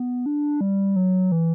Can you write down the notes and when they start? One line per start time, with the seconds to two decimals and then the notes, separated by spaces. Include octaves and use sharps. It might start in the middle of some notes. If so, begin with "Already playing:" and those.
Already playing: B3
0.26 D4
0.61 G3
0.96 F#3
1.32 E3